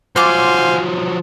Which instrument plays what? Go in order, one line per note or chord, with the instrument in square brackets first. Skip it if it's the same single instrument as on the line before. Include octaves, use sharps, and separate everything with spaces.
[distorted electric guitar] F3 F#3 [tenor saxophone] C5 [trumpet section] F5 G#5 [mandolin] F#5 D6